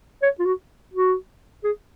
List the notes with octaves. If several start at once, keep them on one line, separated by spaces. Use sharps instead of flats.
C#5
F4
F#4
F#4
G#4